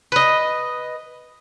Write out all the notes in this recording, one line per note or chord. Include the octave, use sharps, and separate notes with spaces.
B4 D#5